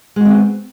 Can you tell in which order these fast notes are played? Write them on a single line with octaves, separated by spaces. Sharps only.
G#3 F#4 C4 B3